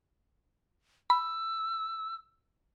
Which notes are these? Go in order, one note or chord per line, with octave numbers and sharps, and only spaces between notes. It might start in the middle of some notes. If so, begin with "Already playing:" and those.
B5 E6